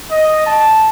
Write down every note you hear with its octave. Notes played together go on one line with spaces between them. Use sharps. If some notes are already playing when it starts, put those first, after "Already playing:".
D#5
A5